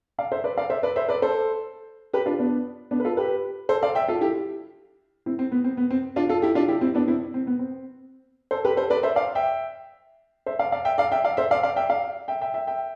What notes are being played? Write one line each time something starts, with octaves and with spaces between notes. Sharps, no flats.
D5 F5
C5 E5
B4 D5
D5 F5
C5 E5
B4 D5
C5 E5
B4 D5
A4 C5
G4 B4
D4 F4
B3 D4
B3 D4
B4
F4 A4
G4 B4
A4 C5
D5 F5
E5 G5
F4 A4
E4 G4
C4 E4
C4
B3
C4
B3
C4
D4 F4
F4 A4
E4 G4
D4 F4
E4 G4
C4 E4
B3 D4
C4 E4
C4
B3
C4
A4 C5
G4 B4
A4 C5
B4 D5
C5 E5
D5 F5
E5 G5
C5 E5
D5 F5
D5 F5
E5 G5
D5 F5
E5 G5
D5 F5
C5 E5
D5 F5
D5 F5
E5 G5
D5 F5
E5 G5
E5 G5
E5 G5
E5 G5